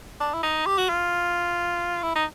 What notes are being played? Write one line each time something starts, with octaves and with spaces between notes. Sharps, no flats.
D4
E4
D#4
G4
F#4
F4
E4
D#4